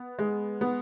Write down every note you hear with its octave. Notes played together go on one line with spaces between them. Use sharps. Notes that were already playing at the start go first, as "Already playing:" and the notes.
Already playing: B3
G#3
B3